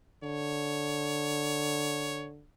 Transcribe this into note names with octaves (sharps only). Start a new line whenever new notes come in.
D3 C#5